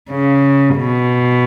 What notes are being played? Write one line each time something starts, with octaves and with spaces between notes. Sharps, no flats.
C#3
B2